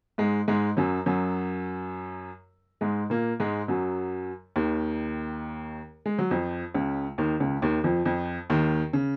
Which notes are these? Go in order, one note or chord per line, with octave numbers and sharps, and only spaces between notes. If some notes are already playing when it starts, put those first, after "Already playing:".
G#2 G#3
G#2 G#3
F#2 F#3
F#2 F#3
G#2 G#3
A#2 A#3
G#2 G#3
F#2 F#3
D#2 D#3
G#3
F#3
F2 F3
C#2 C#3
D#2 D#3
C#2 C#3
D#2 D#3
F2 F3
F2 F3
D#2 D#3
C#3